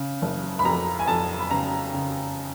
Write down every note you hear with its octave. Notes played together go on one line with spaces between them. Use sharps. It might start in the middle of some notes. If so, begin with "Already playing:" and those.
Already playing: C#3
F#1
B5
F2 A#5
G#5
F2 A5
B5
C#3 A#5
C#3